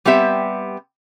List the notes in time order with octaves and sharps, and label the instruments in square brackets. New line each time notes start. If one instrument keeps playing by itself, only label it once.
[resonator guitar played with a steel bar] G3 B3 C4 G4 E5